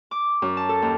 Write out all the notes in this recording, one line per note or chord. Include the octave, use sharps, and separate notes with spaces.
D6
F#2
A5
A4
D#2